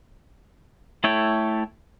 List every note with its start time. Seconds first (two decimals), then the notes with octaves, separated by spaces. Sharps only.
1.04 A3 E4 A4 C#5 G5